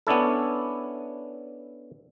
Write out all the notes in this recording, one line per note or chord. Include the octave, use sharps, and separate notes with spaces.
B3 C#4 D4 E4 A4